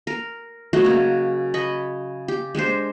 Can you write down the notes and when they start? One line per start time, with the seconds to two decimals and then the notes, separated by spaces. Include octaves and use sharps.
0.07 A#4
0.73 F#3 A3 F#4 D#5
0.85 C#3 A#3
1.54 D#5 B5 C#6
2.28 G4
2.55 G#3 D4 G4 C5